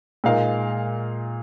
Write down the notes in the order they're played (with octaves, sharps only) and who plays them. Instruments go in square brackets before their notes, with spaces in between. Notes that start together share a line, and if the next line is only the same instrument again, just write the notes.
[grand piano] A#2 G#3 D#4 A#4 F5